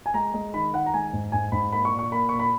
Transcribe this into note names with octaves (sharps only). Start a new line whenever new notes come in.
G#5
G#3 A#5
G#3
D#3 B5
D#3 F#5
A#5
G#3 G#5
G#2
G#2 G#5
G#2 B5
A#3 B5
C#6
A#2
C#6
A#3 B5
A#2 C#6
B5